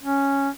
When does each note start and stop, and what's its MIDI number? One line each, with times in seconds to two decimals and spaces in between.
0.03 0.49 61